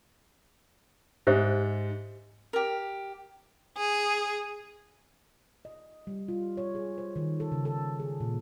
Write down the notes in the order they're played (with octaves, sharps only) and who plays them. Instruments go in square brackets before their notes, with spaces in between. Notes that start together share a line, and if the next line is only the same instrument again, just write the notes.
[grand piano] G#2 [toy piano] G4 C5 E5
[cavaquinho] G4 A#4
[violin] G#4
[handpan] D#5
G3
F4
C#5
G#4
C5
D#3
A4
C#3
A4
G#4
A#2